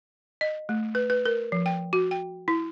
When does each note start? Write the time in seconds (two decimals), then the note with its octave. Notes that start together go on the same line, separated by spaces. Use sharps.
0.41 D#5
0.69 A3
0.95 B4
1.10 B4
1.26 A#4
1.52 F3
1.66 G5
1.93 F#4
2.11 G5
2.48 E4